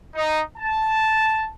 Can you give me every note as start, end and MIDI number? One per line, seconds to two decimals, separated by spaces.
0.14 0.41 63
0.57 1.49 81